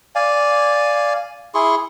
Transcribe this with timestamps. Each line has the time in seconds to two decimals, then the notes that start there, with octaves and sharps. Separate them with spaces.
0.15 D5 F5 G#5
1.54 E4 G#4 C6 C#6